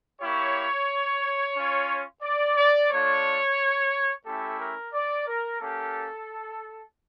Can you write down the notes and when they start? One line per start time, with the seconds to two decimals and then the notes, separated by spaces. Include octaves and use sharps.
0.20 A#3 E4 G4 C#5
1.55 C#4 F4
2.22 D5
2.57 D5
2.91 A3 D4 F4 C#5
4.26 A3 C#4 E4 G4 A4
4.59 A#4
4.94 D5
5.27 A#4
5.60 A#3 C#4 G4 A4